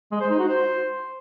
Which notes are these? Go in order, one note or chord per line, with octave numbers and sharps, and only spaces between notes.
G#3
C5
D#4
F#4
C5